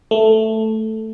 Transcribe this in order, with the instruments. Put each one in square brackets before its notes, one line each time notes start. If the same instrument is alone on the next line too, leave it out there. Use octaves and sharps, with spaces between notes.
[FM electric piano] A3